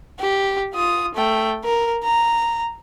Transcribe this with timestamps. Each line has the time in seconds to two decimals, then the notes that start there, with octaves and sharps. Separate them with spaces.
0.20 G4
0.74 F4 D#6
1.15 A3 G5
1.65 A#4
2.04 A#5